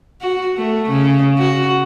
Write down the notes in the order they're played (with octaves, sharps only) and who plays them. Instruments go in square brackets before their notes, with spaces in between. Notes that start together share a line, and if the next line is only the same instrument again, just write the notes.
[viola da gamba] F#4
A3
C#3
F#4